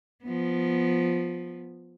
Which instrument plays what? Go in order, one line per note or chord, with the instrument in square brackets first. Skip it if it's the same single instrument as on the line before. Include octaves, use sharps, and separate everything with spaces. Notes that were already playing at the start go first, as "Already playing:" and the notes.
[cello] F3 B3